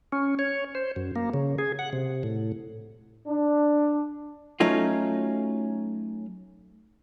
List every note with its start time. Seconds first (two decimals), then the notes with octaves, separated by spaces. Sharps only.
0.12 C#4
0.39 C#5
0.75 C5
0.96 F#2
1.16 A#3
1.34 C#3
1.59 G#4
1.79 F#5
1.93 C3
2.23 A2
3.27 D4
4.60 F#3 A3 C#4 D#4 F4